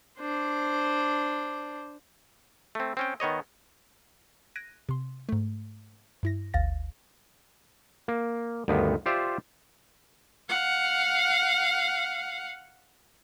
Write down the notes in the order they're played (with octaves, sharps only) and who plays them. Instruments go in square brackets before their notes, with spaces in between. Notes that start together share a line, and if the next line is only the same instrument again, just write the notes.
[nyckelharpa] D4 C5
[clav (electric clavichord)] A3 C4
C4 C#4 G5
D#3 B3 C#5 D#5
[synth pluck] F#6 G#6 A#6 D7 D#7
C3 C6
G#2 A3
G2 E4 A#6
G1 D2 F5 A6 A#6
[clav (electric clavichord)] A#3
D2 G2 D#3 B3
F4 G4 C5 D5 E5
[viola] F5 F#5